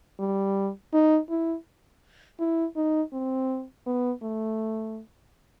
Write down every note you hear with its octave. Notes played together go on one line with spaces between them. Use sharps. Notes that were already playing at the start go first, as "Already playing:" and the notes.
G3
D#4
E4
E4
D#4
C4
B3
A3